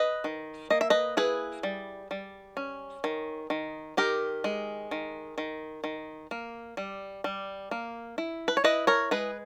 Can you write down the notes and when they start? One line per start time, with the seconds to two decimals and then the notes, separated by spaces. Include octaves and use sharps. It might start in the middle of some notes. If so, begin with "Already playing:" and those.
Already playing: B4 D#5
0.24 D#3
0.70 A#3 D#5
0.81 E5
0.90 B4 D#5
1.17 E4 G#4 B4
1.63 G3
2.11 G3
2.57 C#4
3.04 D#3
3.50 D#3
3.97 D#3 G4 A#4
4.44 G#3
4.91 D#3
5.38 D#3
5.84 D#3
6.31 A#3
6.77 G3
7.24 G3
7.71 A#3
8.18 E4
8.48 B4
8.57 C#5
8.64 E4 B4 D#5
8.87 A#4 C#5
9.11 G#3 G#4 B4